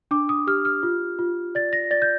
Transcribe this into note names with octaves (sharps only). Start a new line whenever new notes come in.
D4 D6
D#6
G4 F6
F6
F4
F4
D5 A6
A#6
D5 A6
G6